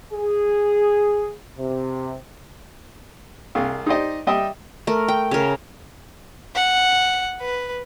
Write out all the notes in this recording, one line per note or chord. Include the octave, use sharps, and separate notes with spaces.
G#4
C3
C2 G#4 F5
D#4 G4 C5 D5 D#5
G3 D#5 E5 G5 D#6
A3 A#4
G5
C#3 A#4
F#5
B4